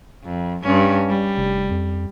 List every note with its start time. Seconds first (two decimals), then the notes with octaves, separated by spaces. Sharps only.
0.25 F2
0.63 G2 C#4
1.08 G3
1.37 F1
1.71 F2